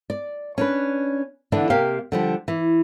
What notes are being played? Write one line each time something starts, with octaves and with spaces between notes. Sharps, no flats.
D5
C#4 D4 B4
D3 E3 B3 D4
C3 A#3 G4 F5
D3 F3 G3
E3